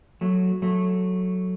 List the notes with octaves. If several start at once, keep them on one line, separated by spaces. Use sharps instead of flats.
F#3 A3
F#3 A3